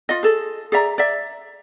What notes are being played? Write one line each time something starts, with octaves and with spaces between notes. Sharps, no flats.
F4 D#5
G#4 A4
G#4 D5 E5 A#5
D5 E5